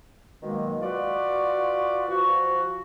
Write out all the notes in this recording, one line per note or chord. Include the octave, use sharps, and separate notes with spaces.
B2 D#3 F#3 G#3 A#3
F4 F#4 B4 D5
F3 F#4